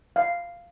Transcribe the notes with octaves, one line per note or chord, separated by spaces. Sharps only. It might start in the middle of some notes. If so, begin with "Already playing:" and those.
F5